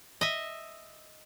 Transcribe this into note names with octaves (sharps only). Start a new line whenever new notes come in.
D#5 E5